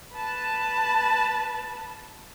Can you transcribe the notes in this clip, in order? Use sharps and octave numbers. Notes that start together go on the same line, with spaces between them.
B4 A5